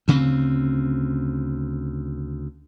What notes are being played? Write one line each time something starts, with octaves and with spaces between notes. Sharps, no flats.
D2 C#3 G3 C4